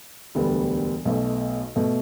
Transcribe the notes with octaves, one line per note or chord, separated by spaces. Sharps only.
E1 D2 D3 G3 B3
B1 B2 A3
B2 A3